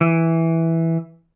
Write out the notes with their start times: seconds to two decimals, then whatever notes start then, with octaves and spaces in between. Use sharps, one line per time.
0.01 E3